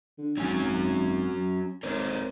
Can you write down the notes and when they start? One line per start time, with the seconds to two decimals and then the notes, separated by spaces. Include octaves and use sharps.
0.18 D3
0.37 G#1 F#3 C#4 G#5
1.83 G#1 A#4 C5 C#5